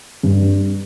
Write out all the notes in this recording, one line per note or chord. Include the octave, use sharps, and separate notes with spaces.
G2